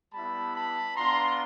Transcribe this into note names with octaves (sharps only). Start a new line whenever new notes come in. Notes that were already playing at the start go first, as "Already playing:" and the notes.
G3 B3 E4 A5 B5
A5 B5
B3 D4 F4 A#5 C6